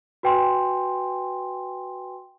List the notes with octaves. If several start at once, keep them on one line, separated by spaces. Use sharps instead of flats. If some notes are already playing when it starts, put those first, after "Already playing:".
F#4 B4 G5 G#5 C6